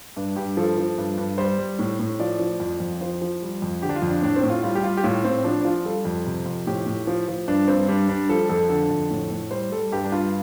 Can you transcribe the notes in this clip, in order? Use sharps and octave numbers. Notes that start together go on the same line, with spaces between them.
G2 D4
G2 G4
F3 A4
F3
G2
G2
G3 C5
G3
A2
A2
F3 D5
F3
F2
F2
F3 C5
F3
G3
F2
D3 G4
D4
F4
F2
D4
A2 D4
C4
A2
F4
G3 F4
G4
G3 F4
G4
A2 F4
A2 C4
F3 D4
D4
F3 F4
G3 A4
F2
C3
F2
A2 G4
A2
F3
F3
G2 D4
G2 C4
G3 D4
G3 D4
F3 A4
F2 A4
D3 A4
F2
A2
A2
G3 C5
G3 A4
G2 G4
D4
G2 F4